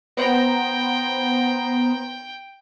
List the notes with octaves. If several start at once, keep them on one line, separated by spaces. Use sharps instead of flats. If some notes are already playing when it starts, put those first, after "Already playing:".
B3 C5 G5 A#5